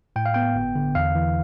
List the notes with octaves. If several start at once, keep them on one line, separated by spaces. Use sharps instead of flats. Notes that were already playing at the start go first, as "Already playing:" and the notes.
A2 G5
F5
B3 G5
G1
D3
E2 F5
E3